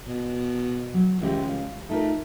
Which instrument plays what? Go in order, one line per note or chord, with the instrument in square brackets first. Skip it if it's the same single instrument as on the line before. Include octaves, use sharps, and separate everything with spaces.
[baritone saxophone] B2
[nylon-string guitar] F#3
[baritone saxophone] C#2 [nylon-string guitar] E3 G#3 G4
[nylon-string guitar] F5
[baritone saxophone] A3 [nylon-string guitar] D#4 F4 A#4